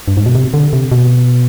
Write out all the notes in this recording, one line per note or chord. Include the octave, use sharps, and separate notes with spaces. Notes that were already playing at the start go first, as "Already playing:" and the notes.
G2
G#2
B2
C3
D3
C3
B2